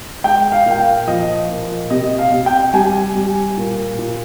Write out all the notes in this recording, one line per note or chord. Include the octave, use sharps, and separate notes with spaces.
G#3 G5
F5
A#2 G5
F5
F3 D#5
A#2
C3 D#5
F5
C3
G5
G3 G#5
G3
A#2
A#2